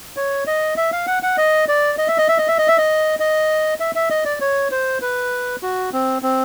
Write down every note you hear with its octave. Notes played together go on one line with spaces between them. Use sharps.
C#5
D#5
E5
F5
F#5
F#5
D#5
D5
D#5
E5
D#5
E5
D#5
E5
D#5
E5
D#5
D#5
E5
E5
D#5
D5
C#5
C5
B4
F#4
C4
C4